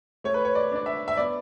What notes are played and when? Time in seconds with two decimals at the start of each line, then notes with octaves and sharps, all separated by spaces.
0.24 A3 C#5
0.34 B4
0.45 C#5
0.55 D5
0.72 D4 D5
0.86 E5
1.08 E5
1.17 B3 D5